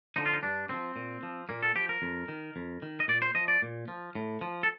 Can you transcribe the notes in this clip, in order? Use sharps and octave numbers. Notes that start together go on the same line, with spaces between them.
D3 F3 D#4
F4
D#4
G2 D4
D3 F3 C4
A#2
F3
A#2 A#3
A4
F3 G4
A#4
F2
D#3
F2
D#3
D#5
A#2 D5
C5
F3 D#5
D5
A#2
F3
A2
F3
A4